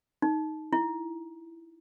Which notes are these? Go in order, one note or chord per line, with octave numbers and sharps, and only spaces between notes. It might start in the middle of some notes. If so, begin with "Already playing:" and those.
D#4
E4